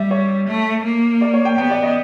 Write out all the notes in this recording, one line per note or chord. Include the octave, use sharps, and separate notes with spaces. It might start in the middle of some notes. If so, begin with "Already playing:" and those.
Already playing: G3 E5
C#5
A3
A#3
D5
C#5
G5
B3 G5
D5
D#5